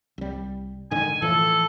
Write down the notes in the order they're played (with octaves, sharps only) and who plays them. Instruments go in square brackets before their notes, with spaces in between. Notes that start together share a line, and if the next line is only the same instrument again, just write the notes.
[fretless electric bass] C2 G3
[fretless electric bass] G#2 D3 D#3 [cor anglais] G#5
[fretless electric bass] A2 E3 F3 [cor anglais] A4